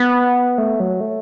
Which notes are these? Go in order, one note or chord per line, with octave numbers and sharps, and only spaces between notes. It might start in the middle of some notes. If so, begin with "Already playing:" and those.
Already playing: B3
A3
F#3
A3